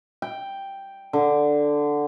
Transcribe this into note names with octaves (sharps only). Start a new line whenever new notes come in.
G5
D3